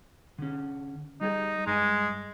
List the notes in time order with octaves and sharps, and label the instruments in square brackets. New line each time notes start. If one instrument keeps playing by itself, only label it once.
[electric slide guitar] D3 C#4
[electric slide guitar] G3 G4 G#4 [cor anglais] D#4
[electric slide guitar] G2 G#5 [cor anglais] G#3